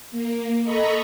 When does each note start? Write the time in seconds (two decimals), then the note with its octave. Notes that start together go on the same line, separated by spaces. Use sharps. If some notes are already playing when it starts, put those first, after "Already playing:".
0.11 A#3
0.63 A4 D#5 A#5 B5 C#6